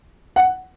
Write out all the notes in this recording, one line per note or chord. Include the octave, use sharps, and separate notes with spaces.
F#5